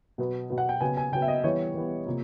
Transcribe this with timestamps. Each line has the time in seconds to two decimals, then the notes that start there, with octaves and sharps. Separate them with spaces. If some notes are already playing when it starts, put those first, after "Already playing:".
0.18 B2 F#3 B3
0.50 B2 F#3 B3
0.58 F#5
0.69 G5
0.81 C#3 F#3 B3 G#5
0.97 G#5
1.12 C#3 F#3 B3 G5
1.22 E5
1.28 D#5
1.44 E3 G3 B3 C#5
1.74 E3 G3 B3
2.06 C3 F3 A#3